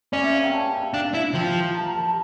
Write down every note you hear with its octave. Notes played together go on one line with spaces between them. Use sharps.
C#4 D5
E5
F5
G5
A5
G5
D4 F5
E4
F3 G5
A5
A#5
A5
A5